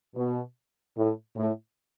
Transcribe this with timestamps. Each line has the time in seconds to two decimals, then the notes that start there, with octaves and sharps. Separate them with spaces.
0.16 B2
0.97 A2
1.36 A2